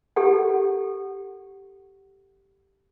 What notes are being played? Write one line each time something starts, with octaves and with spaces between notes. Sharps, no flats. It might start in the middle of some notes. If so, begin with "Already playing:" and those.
G4 A4 F#5